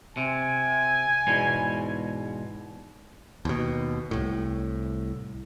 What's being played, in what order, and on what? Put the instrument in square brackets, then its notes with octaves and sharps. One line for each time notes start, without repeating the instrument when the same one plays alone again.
[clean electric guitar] C3 [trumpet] G#5
[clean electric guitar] E2 G#2 B2
[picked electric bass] D#2 B2
C2 A2